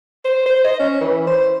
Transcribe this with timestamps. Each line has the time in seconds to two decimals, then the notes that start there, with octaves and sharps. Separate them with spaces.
0.25 C5
0.46 C5
0.65 D#5
0.79 C#4
1.01 E3
1.27 C5